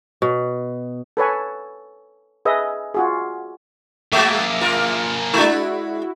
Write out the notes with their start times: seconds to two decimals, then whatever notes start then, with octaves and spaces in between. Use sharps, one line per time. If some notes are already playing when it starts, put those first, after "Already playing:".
0.22 B2
1.17 A4 B4 C#5 G#5
2.45 G#4 B4 D#5 E5
2.94 F4 F#4 G#4
4.13 G#3 A#3 F#4 G#4 E5 D6
4.61 F4 A#4
5.34 G#3 D4 E4 F#4